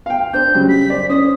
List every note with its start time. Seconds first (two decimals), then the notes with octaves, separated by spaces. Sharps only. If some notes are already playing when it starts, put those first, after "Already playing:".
0.06 F5 G5
0.34 D4 C5 G6
0.54 C#3 F#3 G3
0.69 B6
0.90 C5 D5
1.10 C#4 C5 D5 D#6